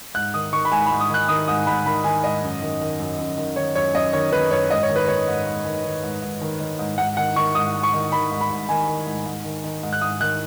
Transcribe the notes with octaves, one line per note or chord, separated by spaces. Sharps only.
G#2 F#6
D#3 D#6
D#3 C#6
B5
G#2 G#5
B5
G#2
D#6
D#3 F#6
D#3 D#6
G#2 D#6
G#2 B5
D#3 B5
D#3 G#5
G#2 D#5
F#2
D#3
D#3
F#2
F#2
D#3
D#3 C#5
F#2 C#5
F#2 D#5
D#3 C#5
D#3 B4
F#2 C#5
G#2 D#5
C#5
D#3
B4
D#3 C#5
G#2
G#2
D#3
D#3
G#2
G#2
D#3
D#3
G#2
G#2 F#5
D#3 F#5
D#3 C#6
G#2 D#6
G#2
C#6
D#3
D#3 B5
G#2
B5
G#2
D#3 G#5
D#3
G#2
G#2
D#3
D#3
G#2
F#6
G#2 D#6
D#3 F#6